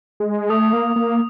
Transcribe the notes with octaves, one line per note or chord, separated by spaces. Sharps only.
G#3
A3 D#6
A#3
A#3